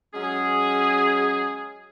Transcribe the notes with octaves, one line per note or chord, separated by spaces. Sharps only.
F#3 G#3 C#4 G#4